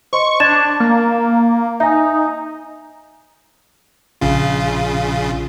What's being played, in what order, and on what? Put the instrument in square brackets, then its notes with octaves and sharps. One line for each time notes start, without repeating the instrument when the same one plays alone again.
[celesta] C5 D#5 C6 [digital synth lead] C#6
[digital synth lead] D4 [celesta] G#6 A6 E7
[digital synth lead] A#3
[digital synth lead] D#4 [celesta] E5 G#5
[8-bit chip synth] A#1 C#3 F4